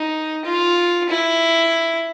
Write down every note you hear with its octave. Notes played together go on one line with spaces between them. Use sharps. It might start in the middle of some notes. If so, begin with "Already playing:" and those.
Already playing: D#4
F4
E4